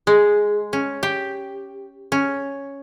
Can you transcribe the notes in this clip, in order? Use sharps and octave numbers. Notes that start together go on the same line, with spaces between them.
G#3
C#4
G4
C#4